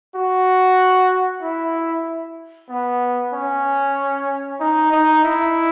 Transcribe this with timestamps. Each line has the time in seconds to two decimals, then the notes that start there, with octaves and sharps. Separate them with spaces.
0.15 F#4
1.42 E4
2.69 B3
3.33 C#4
4.60 D#4
4.92 D#4
5.23 E4